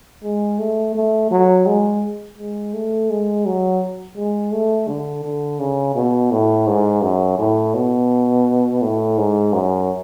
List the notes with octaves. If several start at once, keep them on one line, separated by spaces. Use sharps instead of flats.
G#3
A3
A3
F#3
G#3
G#3
A3
G#3
F#3
G#3
A3
D3
D3
C#3
B2
A2
G#2
F#2
A2
B2
A2
G#2
F#2